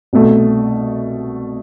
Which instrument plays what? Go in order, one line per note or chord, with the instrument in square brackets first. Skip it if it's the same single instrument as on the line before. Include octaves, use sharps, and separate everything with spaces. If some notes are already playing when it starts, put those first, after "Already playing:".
[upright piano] C2 B2 A3